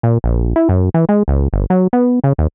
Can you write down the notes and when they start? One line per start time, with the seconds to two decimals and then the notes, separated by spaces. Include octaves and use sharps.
0.03 A#2
0.24 A#1
0.56 E4
0.69 F#2
0.94 E3
1.09 G#3
1.28 C#2
1.53 G1
1.70 F#3
1.93 B3
2.24 C#3
2.38 D#2